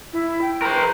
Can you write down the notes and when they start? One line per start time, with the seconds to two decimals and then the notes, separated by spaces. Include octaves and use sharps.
0.13 E4
0.41 G5
0.62 A#4 C5
0.74 B4